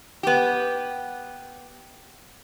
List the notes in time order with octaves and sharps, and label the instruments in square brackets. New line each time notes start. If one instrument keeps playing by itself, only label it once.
[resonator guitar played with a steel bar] B3 G4